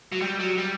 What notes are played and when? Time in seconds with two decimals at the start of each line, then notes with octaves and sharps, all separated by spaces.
0.12 F#3
0.22 G3
0.39 F#3
0.58 G3